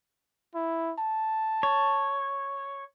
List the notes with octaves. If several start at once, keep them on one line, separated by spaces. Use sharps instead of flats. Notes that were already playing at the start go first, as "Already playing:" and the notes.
E4
A5
C#5